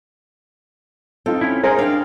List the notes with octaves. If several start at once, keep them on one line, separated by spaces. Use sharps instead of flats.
C4 D#4 F4 A4
C#4 E4
G#3 D#4 G#4 A#4 C5
D4 F5 G5